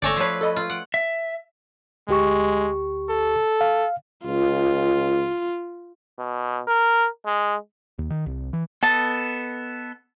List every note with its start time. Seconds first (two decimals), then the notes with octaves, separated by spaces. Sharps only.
0.02 G1 A3 C#5 D5 G#5 A#6
0.16 F3 B4 C#5 C7
0.41 A4 D#5 B5
0.56 F4
0.70 F#5 D7
0.94 E5
2.09 D2 G#3 G4 C#6
3.10 A4
3.61 F5
4.26 C#2 F4
6.19 B2
6.68 A#4
7.26 G#3
7.99 D#2
8.10 D#3
8.26 C2
8.53 E3
8.83 B3 A4 D#5 A5